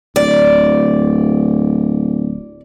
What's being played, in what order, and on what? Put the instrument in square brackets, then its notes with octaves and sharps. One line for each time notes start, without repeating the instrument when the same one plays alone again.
[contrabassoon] D1 [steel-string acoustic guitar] D5